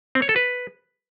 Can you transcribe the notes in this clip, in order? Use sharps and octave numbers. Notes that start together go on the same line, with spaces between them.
C4
C#5
A4
B4